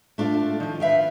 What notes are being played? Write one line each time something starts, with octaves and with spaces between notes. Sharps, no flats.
A3 D4 F4 A4
D#3 F3
B4 E5 F5 G5